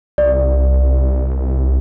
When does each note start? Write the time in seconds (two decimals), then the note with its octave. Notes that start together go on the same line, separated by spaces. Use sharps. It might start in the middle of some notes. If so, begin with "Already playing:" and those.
0.18 C2 D5